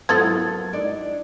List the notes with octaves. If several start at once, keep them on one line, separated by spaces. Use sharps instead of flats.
F3 F#3 B3 E4 A4 A#4 G#6 A6
D4 D#4 D5